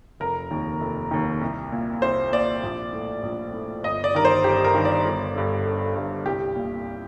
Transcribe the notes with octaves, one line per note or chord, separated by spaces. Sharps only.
F1 A#4
D#2 D#3
F1
D#2 D#3
C2
A#2
C2 C5
A#2 D5
A#1
A2
A#1
A2
G1 D#5
D5
G2 D#3 A#4
C5
G1 G4
A#4
G2 D#3
D5
G1
G2 D3
G1
G2 D3
C2 G4
A#2